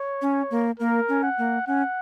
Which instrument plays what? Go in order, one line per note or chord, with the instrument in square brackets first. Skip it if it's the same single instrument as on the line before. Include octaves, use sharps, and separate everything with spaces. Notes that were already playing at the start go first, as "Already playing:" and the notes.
Already playing: [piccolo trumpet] C#5
[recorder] C#4
A#3
[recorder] A#3 [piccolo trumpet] A#4
[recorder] C#4
[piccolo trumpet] F#5
[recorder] A#3
[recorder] C#4 [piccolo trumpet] F#5